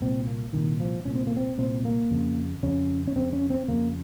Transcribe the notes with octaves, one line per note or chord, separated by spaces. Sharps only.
C2 A#2 C4
A#3
C2 A#2 D#3
F3
C2 A#2 C#4
C4
A#3
C4
C2 A#2 C4
A#3
F2 C#3
F2 C#3 C#4
C#4
F2 C#3 C4
C#4
C4
F2 C#3 A#3